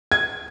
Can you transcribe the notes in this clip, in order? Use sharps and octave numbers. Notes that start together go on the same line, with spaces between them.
G#6